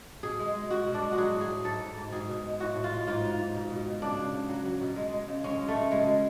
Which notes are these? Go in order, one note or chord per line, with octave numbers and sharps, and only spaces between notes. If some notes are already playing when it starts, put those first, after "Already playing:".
B2 G#4
G#3
G#3
B2 F#4
B2
D4
G#3
F#4
F#3 G#4
A2
G#4
F#3
G#2 A4
G#2
G#2
B2 G#4
B2
G#3
A2 F#4
A2
F4
G#3
G#2 F4
F#3
G#2
B2
B2
B2
C#3 D4
C#3
C#3
F#3
F#3
B2
G#3
G#3
C#3
G#3 C#4
G#3
A3
C#3
B2 G#3
B2